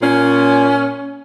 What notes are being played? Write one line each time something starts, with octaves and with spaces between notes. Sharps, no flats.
A#2 C#4